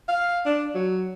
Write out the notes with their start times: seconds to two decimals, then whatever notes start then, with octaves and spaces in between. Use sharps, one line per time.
0.09 F5
0.45 D4
0.75 F#3